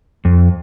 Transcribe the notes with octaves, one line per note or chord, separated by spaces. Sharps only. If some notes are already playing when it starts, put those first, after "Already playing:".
F2